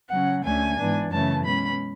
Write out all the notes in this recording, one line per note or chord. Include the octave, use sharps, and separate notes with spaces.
C#3 F#3 C#4 F#5
D2 D3 A3 C#4 G#5
G#2 E3 B3 D4
F#2 C#3 E3 A3 C#4 A5
B2 G#3 C#4 B5